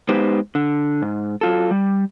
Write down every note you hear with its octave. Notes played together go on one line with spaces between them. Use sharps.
G#3 B3 D#4 G4 B4 C5
D3
G#2
F#3 F4 A4
G3